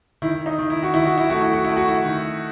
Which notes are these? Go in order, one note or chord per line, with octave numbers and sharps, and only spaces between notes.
D#3 E4
D#4
D#3
E4
F#4
D#3 E4
F#4
E4
A3 F#4
E4
F#4
A3 E4
F#4
E4
D#3